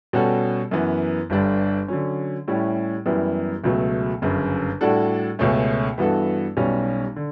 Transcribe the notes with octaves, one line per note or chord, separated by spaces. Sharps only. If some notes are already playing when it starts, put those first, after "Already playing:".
B2 G3 C#4 F#4 A4
F#2 E3 B3
G1 G2 D3 G3 D4
D3 F#3 C#4
A2 G3 C#4 E4
F#2 E3 G3 B3 E4
C#2 B2 F#3 A3
G1 F#2 C#3
A2 G3 D4 F#4 A4
C#2 B2 A3 C#4
G2 E3 B3 F#4 A4
B1 B2 G3 C#4
D3